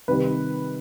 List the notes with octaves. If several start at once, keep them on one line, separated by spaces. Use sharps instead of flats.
C3 D#3 G3 B4